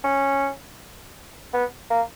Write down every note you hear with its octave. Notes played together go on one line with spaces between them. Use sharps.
C#4
B3
A#3